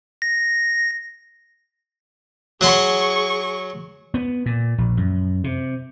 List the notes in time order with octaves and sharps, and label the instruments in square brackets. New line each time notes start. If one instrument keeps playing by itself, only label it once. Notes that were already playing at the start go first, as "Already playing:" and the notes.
[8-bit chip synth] A#6
[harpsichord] F#3 F#5 C6 [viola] G#4 C#6
[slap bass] B3
A#2
A#1
F#2
C3